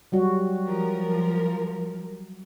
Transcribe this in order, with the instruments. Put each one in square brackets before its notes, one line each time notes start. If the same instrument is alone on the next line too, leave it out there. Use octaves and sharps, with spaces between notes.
[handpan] F#3 G3 F#4
[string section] F3 A#4